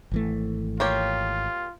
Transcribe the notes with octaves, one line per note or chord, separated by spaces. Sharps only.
G#1 E3 A3
A#3 F4 G4 C#5